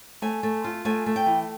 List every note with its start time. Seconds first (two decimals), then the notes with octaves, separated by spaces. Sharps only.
0.22 A3 G#5
0.43 A3
0.64 F4
0.85 A3 G#5
1.06 A3
1.16 G5
1.26 E3